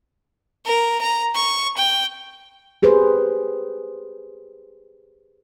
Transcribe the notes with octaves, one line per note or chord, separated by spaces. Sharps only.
A#4
A#5
C#6
G5
G4 G#4 B4 C5